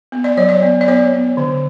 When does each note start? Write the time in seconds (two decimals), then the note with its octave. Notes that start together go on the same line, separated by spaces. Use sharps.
0.12 B3
0.24 D5
0.37 F#3 C#5
0.49 D5
0.62 B3
0.81 D5
0.88 B3 C#5
1.13 B3
1.37 D3